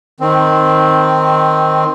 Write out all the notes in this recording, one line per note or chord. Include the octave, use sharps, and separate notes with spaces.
D#3 C4